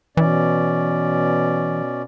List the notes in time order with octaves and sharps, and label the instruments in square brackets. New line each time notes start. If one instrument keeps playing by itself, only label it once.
[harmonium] B2 C#4 D5 [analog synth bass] E3